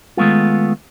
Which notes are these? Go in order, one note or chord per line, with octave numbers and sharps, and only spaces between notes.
D#3 G#3 A3 B3 F4